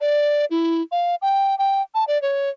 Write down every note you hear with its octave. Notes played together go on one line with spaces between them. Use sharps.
D5
E4
F5
G5
G5
A5
D5
C#5